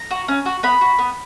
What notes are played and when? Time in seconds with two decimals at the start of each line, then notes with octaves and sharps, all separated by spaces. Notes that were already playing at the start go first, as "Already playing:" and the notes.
Already playing: A#5
0.11 F#4
0.28 C#4
0.46 F#4
0.63 B3 B5
0.81 F#4
0.99 B3